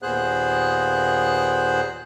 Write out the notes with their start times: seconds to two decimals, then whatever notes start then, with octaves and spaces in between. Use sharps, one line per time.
0.02 D#2 A#2 B3 G#4 C5 F#6